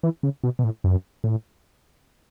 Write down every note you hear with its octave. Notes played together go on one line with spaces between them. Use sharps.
E3
C#3
B2
B2
A2
F#2
A2